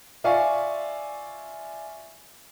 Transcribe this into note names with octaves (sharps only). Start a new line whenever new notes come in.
F4 D5 E5 F5 G#5 C#6